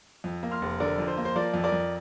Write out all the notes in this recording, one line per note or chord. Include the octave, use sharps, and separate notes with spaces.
F2
A#3
C6 F6
F1
D3 A#4 D5
F2
C5
A#3
C5
F3 A#4 D5
F2
A#4 D5
F2